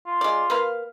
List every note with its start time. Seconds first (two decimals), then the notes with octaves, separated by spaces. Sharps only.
0.07 F4
0.21 G#3 D5
0.50 A#3 B4 F5